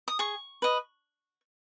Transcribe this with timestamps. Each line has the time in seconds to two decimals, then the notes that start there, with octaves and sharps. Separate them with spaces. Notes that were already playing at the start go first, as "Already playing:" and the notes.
0.08 D#6
0.19 G#4 C#6
0.62 B4 D#5